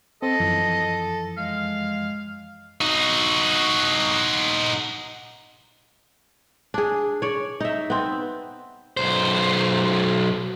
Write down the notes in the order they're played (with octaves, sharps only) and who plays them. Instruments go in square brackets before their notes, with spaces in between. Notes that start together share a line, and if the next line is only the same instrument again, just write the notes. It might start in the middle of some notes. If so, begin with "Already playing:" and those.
[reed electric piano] C4 [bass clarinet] A4 [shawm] D#5
[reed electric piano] F#2 E3 F3
[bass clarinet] G#3 [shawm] F5
[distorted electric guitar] D#4 F#4
[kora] D4 G#4
C#5 D5
D#4 E5
B3 C4
[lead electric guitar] B1 C5